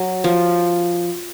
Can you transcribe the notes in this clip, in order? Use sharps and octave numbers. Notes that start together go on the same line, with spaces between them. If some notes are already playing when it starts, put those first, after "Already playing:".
Already playing: F#3
F3